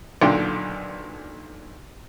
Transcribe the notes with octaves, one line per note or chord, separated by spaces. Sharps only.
B1 A#2 D3 G5 C6